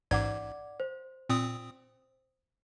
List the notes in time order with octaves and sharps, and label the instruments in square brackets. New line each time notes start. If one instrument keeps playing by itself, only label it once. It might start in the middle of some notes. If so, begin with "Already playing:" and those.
[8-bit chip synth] A1 G#2 G#6 [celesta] D5 F#5 D6
[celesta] C5
[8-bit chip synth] A#2 C4 D#6